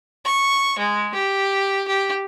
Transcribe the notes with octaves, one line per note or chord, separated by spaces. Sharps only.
C#6
G#3
G4
G4